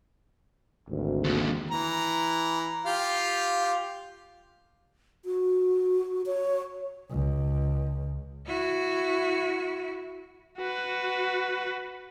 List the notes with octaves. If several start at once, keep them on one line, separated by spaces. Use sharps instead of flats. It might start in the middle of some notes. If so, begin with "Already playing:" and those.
G#1 D2
D#2 D3
E3 A#5
F4 G4 F5
F#4
C#5
C#2
E4 F#4
F#4 B4